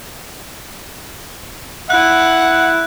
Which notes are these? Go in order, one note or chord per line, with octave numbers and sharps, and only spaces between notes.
E4 F#5 F#6